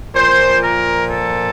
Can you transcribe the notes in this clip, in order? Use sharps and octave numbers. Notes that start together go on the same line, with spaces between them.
A#2 F3 C5
A#4
A4